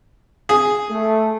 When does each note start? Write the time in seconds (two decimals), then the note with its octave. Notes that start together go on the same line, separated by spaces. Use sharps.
0.49 G#4
0.91 A3